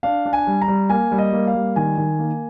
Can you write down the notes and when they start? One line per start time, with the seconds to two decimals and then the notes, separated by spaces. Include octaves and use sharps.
0.03 D4 F5
0.26 D4
0.33 G#5
0.47 G3
0.62 A#5
0.68 G3
0.89 A#3 G#5
1.12 G3
1.18 D#5
1.33 A#3
1.47 F5
1.54 G3
1.76 D#3 G#5
1.98 D#3
2.19 A#3